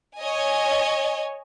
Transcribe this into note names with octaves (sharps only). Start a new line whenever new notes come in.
C#5 D#5 G#5